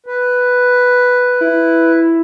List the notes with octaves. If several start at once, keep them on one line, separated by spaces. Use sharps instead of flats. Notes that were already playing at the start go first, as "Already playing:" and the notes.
B4
E4